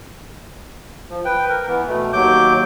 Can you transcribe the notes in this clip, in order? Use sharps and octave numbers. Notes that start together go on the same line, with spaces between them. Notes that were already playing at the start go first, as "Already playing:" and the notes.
F3
B4 G5
A#4
E3 B3
B2 A3
D#2 F#3 D6 G6